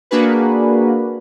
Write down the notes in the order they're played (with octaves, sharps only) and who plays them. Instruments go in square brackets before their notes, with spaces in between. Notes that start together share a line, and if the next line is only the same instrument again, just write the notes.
[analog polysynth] A#3 D4 F#4 G#4 B4